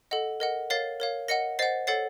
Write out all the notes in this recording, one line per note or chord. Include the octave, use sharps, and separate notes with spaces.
A4 D#5 F#5
A#4 D#5 F#5
A#4 C#5 F5 A6 C7
A#4 C#5 F5
A#4 D#5 F#5 A#6 C#7
C5 D#5 F#5 A6 C7
A4 C#5 F#5 A6 C7